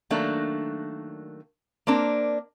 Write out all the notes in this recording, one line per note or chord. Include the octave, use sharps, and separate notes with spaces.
D#3 F#3 A3 A#3 D4
A#3 C4 D4 A#4